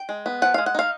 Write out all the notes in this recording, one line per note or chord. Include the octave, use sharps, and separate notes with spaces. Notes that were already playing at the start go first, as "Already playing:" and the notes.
Already playing: G5
G#3
B3
F3 F#5
G#3 F5
F#5
D#4 F5